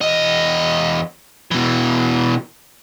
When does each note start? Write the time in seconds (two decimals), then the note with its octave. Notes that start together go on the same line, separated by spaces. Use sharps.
0.01 E2 D#5
1.51 B2 E3